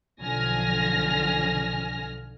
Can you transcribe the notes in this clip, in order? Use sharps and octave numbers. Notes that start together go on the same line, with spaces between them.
B1 D3 F3 G#5 F6 A#6